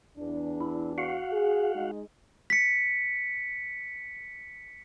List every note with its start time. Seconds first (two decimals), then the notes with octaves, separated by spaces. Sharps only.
0.17 E2 D4
0.61 E4
0.98 F#4 F5 F#5
1.31 G#4
1.73 G#3 D#4 D#5
2.50 B6 C#7